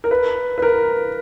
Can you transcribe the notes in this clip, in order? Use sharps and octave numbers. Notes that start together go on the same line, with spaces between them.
A#4
B4
B4
A#4